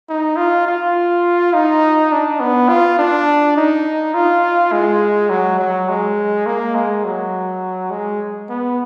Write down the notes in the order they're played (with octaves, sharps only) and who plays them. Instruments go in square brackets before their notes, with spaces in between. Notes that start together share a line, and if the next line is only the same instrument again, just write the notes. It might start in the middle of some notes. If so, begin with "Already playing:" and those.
[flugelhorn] D#4
F4
F4
D#4
D4
B3
F4
D4
D#4
F4
G#3
F#3
F#3
G#3
A#3
G#3
F#3
G#3
B3